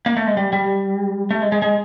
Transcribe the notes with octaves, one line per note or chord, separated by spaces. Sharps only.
A#3
A3
G#3
G3
G3
A3
G#3
G#3
G#3